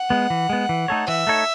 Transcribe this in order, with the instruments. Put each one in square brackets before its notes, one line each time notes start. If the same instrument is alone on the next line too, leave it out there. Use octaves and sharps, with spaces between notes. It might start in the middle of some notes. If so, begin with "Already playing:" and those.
Already playing: [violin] F#5
[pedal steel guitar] G#3 B3
E3
G#3 B3
E3
A3 D#4 A4 C#5
[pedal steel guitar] E3 [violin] E5
[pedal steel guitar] A3 D#4 A4 C#5